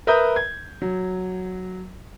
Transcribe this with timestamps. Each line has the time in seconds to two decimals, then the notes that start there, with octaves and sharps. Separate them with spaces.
0.07 A#4 B4 E5 A#5 D#6 G6
0.36 G#6
0.82 F#3